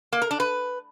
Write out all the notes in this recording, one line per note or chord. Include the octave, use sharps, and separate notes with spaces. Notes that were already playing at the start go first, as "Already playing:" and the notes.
A#3
A#4
D4
B4